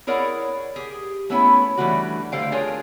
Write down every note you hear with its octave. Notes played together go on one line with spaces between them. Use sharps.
E4 G#4 A#4 C#5 D5 F#5
G4 G#4
A3 B3 C#4 E4 B4 C#5
E3 G3 A3 D4 F#4
D3 G3 A3 C5 F5 G5
D4 F4 G#4 A#4 C#5